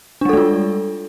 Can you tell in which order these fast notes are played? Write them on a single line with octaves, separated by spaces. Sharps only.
D4 G3 A4 G#3 F4